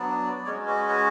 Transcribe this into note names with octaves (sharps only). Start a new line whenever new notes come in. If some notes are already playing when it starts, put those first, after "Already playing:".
Already playing: F#3 B3 D4 D5
G#3 C#4 F#4 C#5
B4
C#5